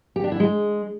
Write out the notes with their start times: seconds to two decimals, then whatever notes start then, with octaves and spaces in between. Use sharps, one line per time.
0.16 G4
0.24 D4
0.32 E4
0.40 G#3